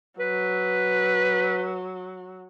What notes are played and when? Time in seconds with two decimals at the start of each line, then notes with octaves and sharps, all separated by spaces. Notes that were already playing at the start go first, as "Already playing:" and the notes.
0.19 F#3 B4